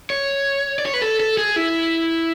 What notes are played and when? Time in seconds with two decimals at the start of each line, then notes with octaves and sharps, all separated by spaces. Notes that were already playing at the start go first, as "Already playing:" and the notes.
0.10 C#5
0.79 D5
0.86 C#5
0.94 B4
1.02 A4
1.20 A4
1.38 G#4
1.56 E4